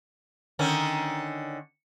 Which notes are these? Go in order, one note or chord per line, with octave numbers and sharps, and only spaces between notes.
D3 D#3 C#4